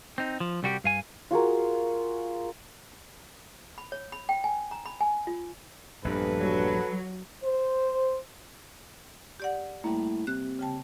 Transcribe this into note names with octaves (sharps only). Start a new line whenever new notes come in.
C4 D#4
F3
C2 G3 F#4 G4
G2 F5 G#5
F4 F#4 G#4 A#4
B5
C#5
B5
G5
G#5
A#5
B5
G#5
F4
A#1 E2 G2 A4 B4
F#3
C5
G4 D5 F#5
A2 G3 A#3
C3 F#6
C#3 G5 A5